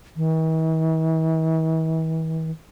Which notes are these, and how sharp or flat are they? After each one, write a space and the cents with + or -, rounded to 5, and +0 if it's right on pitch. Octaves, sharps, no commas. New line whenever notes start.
E3 -45